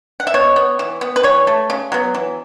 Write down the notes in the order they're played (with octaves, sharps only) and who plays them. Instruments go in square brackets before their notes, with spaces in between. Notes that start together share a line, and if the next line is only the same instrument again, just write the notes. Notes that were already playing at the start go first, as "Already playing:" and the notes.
[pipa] F#5
E5
B2 C#5
B3
E3
B3
B4
E3 C#5
A3
C#3
F#3 B3
E3